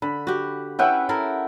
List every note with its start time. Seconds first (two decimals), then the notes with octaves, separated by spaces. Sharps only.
0.02 D3 B5
0.27 F#4 G4
0.79 C#4 E4 B4 E5 F#5 G5
1.09 E4 A4 A#4